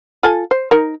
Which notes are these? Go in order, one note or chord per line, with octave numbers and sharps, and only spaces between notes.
F4 A4 G#5
C5
D#4 A#4